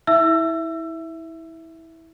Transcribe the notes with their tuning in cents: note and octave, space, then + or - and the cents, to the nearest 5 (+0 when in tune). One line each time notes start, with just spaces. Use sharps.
E4 -25 E5 +5 E6 +25